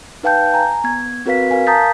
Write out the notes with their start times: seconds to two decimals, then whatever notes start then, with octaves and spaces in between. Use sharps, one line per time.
0.23 D#4 B4 F5 G5 A5 G6
0.54 G#5 A#5
0.84 B3 G#6
1.26 C4 F#4 A#4 B4 F5 B6
1.51 A#4 F5 G#5
1.67 A5 A#5 D#6 G6 A6 B6